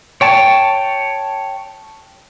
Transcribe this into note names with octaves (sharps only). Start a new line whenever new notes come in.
C#5 G5 A5